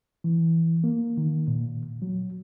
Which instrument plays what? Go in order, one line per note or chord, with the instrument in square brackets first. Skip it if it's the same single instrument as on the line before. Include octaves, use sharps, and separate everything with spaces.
[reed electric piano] E3
A#3
D#3
A#2
F#3